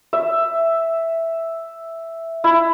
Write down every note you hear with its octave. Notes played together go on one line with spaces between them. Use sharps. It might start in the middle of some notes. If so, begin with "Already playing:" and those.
E5
E4